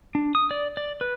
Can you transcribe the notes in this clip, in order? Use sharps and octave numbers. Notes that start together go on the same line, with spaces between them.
D4
D#6
D5
D5
B4